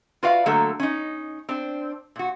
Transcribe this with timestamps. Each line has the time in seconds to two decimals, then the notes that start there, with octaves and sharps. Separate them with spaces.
0.23 F4 F#4 B4 D5 E5 F5
0.46 D3 F#3 A3 A#3 F#4 A4
0.80 C#4 D#4
1.49 C4 D4
2.16 A#2 F#4